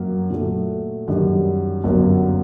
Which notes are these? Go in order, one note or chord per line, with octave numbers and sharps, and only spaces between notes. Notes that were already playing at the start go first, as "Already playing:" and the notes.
Already playing: F#2 F#3 A#3
A#2 F#3 A3
F#2 D#3 G3
G1 F#2 F#3 A#3